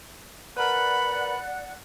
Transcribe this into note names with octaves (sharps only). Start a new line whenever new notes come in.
A#4 B4 D5 F#5 B5 F#6